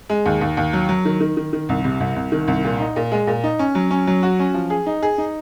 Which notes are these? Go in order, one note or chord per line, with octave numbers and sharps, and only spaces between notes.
G#3
D#2
D#2
D#2
F#3
F#3
D#3
D#3
D#3
D#3
C2
C3
C2
C2
D#3
C2
A#2
D#4
A#2
G#3
A#2
D#4
C#4
F#3
C#4
F#3
F#4
C#4
F3
G#4
D#4
G#4
D#4